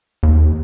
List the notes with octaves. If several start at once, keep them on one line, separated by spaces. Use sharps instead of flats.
D#2